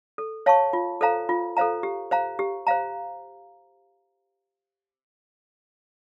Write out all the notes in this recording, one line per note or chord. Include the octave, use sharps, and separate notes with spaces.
A4
C#5 F5 A5 C#6
F4
A4 C5 F5 A#5
F4
A4 C5 F5 A#5
G4
C5 F5 A#5
G4
C5 F5 A#5